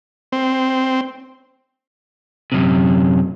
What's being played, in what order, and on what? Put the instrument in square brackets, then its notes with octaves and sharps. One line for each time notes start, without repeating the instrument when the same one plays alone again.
[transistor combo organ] C4
[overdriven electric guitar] F#2 C3